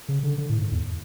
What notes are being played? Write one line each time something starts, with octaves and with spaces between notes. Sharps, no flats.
C#3
D3
D3
A2
G#2
E2